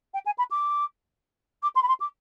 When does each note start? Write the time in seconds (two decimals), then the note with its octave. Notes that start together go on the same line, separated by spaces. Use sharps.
0.14 G5
0.25 G#5
0.38 B5
0.50 D6
1.62 D6
1.75 C6
1.82 B5
1.88 C6
2.00 D6